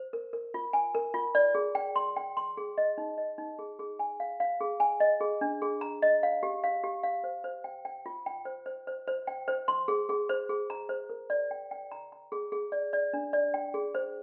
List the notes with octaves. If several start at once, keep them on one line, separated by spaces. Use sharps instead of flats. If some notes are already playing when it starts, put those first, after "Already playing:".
Already playing: C5
A#4
A#4
F4
G#5
A#4
F4
D5
G#4
G5
C6
G5
C6
G#4
D#5
D#4
D#5
D#4
G#4
G#4
G#5
F5
F5
G#4
G#5
D#5
G#4
D4
G#4
A#5
D#5
F5
G4
F5
G4
F5
C5
C5
G5
G5
F4
G5
C5
C5
C5
C5
G5
C5
C6
G#4
G#4
C5
G#4
A#5
C5
A#4
D5
G5
G5
A#5
A#5
G#4
G#4
D5
D5
D4
D5
G5
G#4
C5